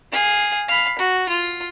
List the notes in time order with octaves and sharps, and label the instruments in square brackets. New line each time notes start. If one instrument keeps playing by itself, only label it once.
[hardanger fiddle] G#4 F5
F5 B5
F#4
F4